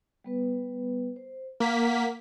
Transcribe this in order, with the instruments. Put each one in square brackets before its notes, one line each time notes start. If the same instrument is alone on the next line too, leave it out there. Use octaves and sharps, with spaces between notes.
[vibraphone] G3 B3 B4
C5
[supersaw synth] A#3 B6 [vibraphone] A#4 F#5